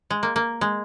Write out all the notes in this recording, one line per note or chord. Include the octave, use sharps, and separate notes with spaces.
G#3
A#3
A#3
G#3